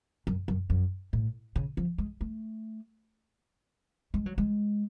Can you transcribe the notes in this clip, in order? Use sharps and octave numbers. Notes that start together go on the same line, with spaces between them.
F#2
F#2
F#2
A2
C#3
F3
G#3
A3
G#3
F#3
G#3